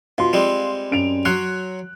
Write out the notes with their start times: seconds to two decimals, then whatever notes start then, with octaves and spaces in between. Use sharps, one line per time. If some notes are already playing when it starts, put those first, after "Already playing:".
0.18 B2 F4 C6
0.33 G3 G#3 C4
0.91 F#2 D7 F7
1.25 F#3 C#5 C6 F#6